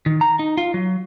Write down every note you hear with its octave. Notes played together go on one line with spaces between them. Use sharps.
D#3
A#5
D#4
F4
F#3